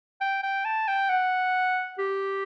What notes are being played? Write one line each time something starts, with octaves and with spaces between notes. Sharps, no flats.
G5
G5
A5
G5
F#5
G4